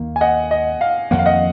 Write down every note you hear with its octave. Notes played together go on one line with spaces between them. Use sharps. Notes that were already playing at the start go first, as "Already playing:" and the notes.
Already playing: D#2 D#3 A#3
G#5
D#5 F#5
D#5
F5
F2 D#3 A#3 F#5
F5
D#5 F#5